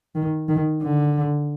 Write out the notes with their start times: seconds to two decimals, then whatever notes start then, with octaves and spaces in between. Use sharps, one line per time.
0.15 D#3
0.48 D#3
0.82 D3